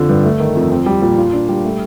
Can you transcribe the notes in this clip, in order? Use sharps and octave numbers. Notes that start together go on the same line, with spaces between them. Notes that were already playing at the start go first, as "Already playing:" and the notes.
Already playing: F2 D3 F3
G2
A3
D#3
F2
C4
G3
A#2
F4
D4
G3
A3